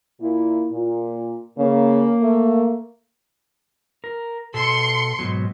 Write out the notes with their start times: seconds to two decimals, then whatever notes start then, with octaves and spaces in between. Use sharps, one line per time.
0.19 A#2 A#3 E4
0.71 A#2
1.58 C#3 A#3
2.22 A3
4.04 A#4
4.54 B2 A4 C6 C#7
5.19 G#2 B2 F#3